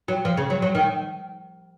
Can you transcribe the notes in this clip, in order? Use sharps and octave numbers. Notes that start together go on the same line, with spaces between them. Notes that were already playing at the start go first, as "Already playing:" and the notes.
F#3
F3
C#3
F#3
F#3
D#3